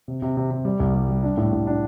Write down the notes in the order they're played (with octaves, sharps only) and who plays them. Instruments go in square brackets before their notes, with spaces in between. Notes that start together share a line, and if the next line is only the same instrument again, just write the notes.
[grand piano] C3
C3
C3
C3
G3
C2
G3
G3
D4
A2
A2
D4